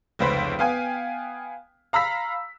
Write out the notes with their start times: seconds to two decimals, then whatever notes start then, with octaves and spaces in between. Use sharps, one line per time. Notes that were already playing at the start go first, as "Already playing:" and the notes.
0.19 F1 C#2 B4 C5 B5 B6
0.59 B3 F5 G5 G#5
1.93 F5 A#5 B5 E6 B6